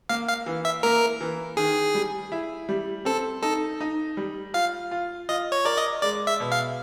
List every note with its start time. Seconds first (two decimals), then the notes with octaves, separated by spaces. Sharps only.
0.09 A#3 F5
0.28 F5
0.46 E3
0.65 E5
0.83 A#3 A#4
1.21 E3
1.57 D#3 G#4
1.95 G3
2.32 E4
2.69 G3
3.05 C4 A4
3.42 D#4 A4
3.80 D#4
4.17 G3
4.54 F4 F5
4.91 F4
5.29 F4 D#5
5.52 C#5
5.65 A#4 D5
5.77 D#5
6.02 G#3 D5
6.27 E5
6.40 B2
6.52 F5